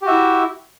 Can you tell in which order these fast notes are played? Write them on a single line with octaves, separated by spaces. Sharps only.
G4 F#4 E5 E4